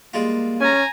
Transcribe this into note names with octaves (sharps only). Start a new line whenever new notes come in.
G3 G#3 A#3 F4
C#4 G#5 A#5